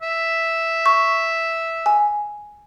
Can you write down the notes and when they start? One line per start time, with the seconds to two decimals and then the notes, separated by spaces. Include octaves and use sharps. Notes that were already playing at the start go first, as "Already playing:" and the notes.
0.02 E5
0.86 C#6
1.86 G#5